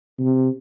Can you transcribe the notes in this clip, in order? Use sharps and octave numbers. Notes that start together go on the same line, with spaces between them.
C3